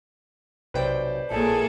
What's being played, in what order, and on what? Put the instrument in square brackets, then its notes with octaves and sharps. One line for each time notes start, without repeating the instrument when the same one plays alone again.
[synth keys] B1 C3 G5 [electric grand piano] B4 C5 D5
[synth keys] A#1 A2 [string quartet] A#3 G#4 A4